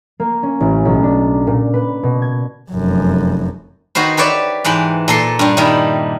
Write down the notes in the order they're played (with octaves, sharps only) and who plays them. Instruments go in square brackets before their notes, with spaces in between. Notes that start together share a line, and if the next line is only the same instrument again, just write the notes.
[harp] A#3
C#4
A1
B1
D4
A#2
B4
B2
G#6
[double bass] F1 F#2
[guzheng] D#3 F#4 B4 C5
G4 B4 C#5 D5 E5
G#2 E3 G5 B5
A#2 A4 C6
G2 G3
D#3 G3 E4